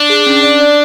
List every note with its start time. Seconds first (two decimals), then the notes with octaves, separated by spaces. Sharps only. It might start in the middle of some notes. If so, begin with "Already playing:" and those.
Already playing: D4
0.10 G#4
0.26 C#4
0.43 D5
0.60 D5